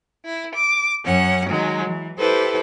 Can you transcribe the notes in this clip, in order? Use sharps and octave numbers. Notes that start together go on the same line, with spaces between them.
E4
D6
F#2 C#4 F#5
D#3 F#3 G#3
E3
E4 G4 A4 B4 C5